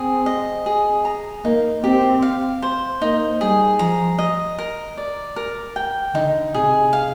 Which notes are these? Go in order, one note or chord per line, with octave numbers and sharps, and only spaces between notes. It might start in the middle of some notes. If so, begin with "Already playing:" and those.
Already playing: C4 G#4
D#5
G#4
A#5
A#3 D#4
C4 G4
F5
C5
A#3 D#4
G3 G#4
F3 A#5
D#5
A#4
D5
A#4
G5
D3 D#4
C3 G#4
F5